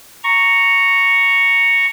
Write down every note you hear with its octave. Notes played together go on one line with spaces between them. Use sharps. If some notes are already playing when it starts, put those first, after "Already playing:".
A#5 C#6